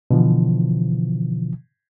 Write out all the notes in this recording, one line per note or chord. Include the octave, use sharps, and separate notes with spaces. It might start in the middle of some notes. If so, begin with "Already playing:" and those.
B2 D3 E3 F3